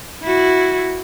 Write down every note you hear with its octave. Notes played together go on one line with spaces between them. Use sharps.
E4 F#4